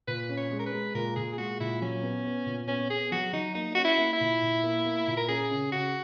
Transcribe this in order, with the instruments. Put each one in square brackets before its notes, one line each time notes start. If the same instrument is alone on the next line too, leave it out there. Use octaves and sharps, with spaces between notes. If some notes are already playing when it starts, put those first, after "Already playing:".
[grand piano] A#2 [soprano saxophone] B4
[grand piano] C#4
[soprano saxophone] C#5
[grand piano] G#3
[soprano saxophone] A#4
B4
[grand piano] G#3
[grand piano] A#2 [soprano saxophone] A#4
[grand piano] A#2 [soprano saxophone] G#4
[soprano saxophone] G#4
[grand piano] G#3 [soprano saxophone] F#4
[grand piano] A#2 [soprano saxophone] E4
[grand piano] F#3 [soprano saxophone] C#4
[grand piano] B3
B3
A#2
[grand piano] B3 [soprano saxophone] C#4
[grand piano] B3 [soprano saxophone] G#4
[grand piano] F#3 [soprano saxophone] F#4
[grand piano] F#3 [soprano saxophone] D#4
[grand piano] A#3 [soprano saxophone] D#4
[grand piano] C#4 [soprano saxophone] F#4
[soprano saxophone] E4
[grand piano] A#3
[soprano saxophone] E4
[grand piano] A#2
A#2
A#3
A#3
A#2
[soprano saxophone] A#4
[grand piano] C#4 [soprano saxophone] G#4
[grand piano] C#3
[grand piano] C#3 [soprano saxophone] F#4